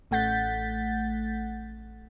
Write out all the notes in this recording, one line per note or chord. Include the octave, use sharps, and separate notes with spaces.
A1 A3 F#5 G6 A6 B6